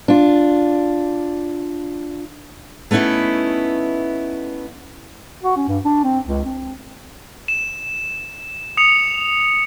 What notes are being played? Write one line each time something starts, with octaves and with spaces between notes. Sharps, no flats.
D4 F4
A3 B3 C#4 D#4 E4
F#4
C#4
G2
D4
C4
C#2
C4
E7
D#6 C#7 F7